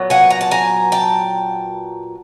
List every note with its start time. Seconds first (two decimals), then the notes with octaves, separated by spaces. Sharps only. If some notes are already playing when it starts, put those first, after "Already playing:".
Already playing: A#2 F#3 B3
0.10 F#5 G#5
0.30 A#5
0.41 A5
0.51 G#5 A#5
0.92 G5 A5